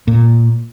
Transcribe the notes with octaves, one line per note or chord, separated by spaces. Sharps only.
A#2